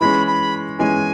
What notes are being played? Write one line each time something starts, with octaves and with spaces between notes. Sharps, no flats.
E3 G#3 C#4 B5
B5
E3 G#3 C#4 G#5